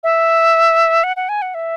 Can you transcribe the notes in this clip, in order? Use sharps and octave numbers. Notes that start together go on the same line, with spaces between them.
E5
F#5
F#5
G#5
F#5
E5